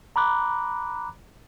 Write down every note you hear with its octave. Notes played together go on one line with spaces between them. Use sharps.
A#5 B5 D6 F#6